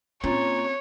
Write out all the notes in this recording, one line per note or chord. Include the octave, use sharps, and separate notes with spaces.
A#2 C4 C#4 C#5